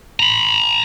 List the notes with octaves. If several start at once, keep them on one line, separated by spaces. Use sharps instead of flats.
A#5 B5